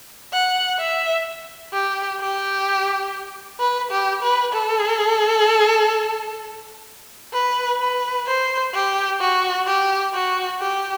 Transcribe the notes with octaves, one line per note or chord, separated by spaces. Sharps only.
F#5
E5
G4
G4
B4
G4
B4
A4
B4
B4
C5
G4
F#4
G4
F#4
G4